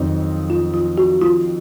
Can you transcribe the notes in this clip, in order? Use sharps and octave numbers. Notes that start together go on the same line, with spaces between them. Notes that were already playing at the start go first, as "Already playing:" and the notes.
Already playing: F2 D#3 F#3 C4 D#4
F4
F4
F#4
F4